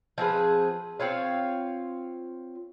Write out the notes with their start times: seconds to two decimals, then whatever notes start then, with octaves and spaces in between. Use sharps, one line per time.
0.18 F3 C4 G#4 B4
1.00 C4 F4 C#5 F5